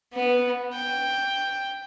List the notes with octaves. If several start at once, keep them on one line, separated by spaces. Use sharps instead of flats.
B3
G5